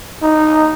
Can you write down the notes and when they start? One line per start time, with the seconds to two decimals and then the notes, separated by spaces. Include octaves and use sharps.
0.23 D#4